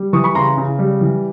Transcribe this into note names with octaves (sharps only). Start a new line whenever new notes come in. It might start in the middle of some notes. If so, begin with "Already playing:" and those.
Already playing: G3
E3 C#6 D#6
B5 C#6
C#3 A#5 C6
C#3
G3
E3